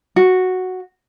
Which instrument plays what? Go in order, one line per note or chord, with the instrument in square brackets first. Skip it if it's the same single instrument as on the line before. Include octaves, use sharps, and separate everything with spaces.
[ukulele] F#4